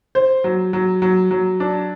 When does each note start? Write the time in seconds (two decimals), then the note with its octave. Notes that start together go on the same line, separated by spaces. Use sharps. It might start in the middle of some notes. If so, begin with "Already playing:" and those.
0.15 C5
0.44 F#3
0.73 F#3
1.02 F#3
1.31 F#3
1.60 D4